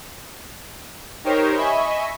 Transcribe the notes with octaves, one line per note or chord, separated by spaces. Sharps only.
D#4 G4 A#4 C5 C#5
D#5 E5 G#5 B5 C#6